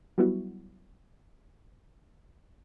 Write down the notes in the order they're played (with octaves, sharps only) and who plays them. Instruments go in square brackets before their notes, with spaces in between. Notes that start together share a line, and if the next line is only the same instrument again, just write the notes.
[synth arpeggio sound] F#3 G3 B3 E4 F#4